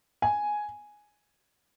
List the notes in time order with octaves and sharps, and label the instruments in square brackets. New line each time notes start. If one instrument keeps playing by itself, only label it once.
[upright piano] G#5